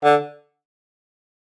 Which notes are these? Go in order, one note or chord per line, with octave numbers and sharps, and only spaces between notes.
D3